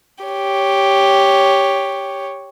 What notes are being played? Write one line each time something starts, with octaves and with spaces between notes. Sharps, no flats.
G4 C#5